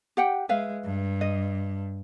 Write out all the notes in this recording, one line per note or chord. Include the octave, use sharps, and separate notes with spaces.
G4 F#5 G5
G#3 B4 E5 F5
G2
D#5